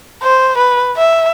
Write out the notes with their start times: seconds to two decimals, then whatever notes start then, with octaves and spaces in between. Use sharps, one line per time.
0.23 C5
0.58 B4
0.97 E5